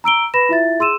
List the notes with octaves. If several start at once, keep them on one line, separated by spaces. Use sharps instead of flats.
A#5 E6 D7 G7
B4 B5 A#6 E7
E4 F4 E5 A6
G#4 C6 E6 D#7 E7